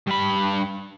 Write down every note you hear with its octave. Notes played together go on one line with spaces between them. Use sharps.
G2 B5